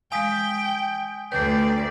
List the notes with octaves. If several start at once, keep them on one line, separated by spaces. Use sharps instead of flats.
G#3 F5 G5 G#5 D#6 B6
D2 A3 B4 D5 G5